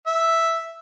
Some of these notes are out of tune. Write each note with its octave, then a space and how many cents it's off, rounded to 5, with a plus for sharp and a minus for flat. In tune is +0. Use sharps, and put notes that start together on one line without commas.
E5 +0